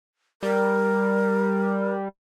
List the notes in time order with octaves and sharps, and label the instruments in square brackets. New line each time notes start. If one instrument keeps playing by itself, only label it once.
[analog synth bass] G3 [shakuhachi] A#4